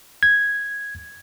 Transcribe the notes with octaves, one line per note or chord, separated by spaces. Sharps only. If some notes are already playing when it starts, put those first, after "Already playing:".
G#6